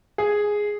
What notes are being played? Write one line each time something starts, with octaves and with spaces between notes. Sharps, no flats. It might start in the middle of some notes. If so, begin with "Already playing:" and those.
G#4